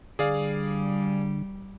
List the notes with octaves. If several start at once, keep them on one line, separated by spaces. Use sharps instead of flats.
D3 G3 G#4 D5 F5